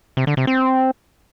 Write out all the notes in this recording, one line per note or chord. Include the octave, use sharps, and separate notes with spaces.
C3
D3
C3
C4